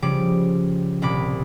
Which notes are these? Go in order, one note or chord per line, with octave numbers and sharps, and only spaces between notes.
C#3 F3 G3 D6
D#1 C2 A#2 B5 D6